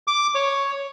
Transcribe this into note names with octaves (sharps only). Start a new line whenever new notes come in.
D6
C#5